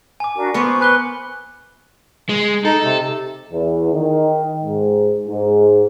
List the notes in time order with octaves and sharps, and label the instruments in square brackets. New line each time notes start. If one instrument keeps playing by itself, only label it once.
[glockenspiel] G#5 D6
[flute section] D4 F#4 A#4
[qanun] B3 A#4 [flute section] C5 C#6 D6 [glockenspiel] C#7
[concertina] B4 [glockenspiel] G#5 F#6 G7
[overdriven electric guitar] G#3
[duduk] D#4 [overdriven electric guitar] A4
[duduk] C3
[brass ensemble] E2
D#3
G#2
G#2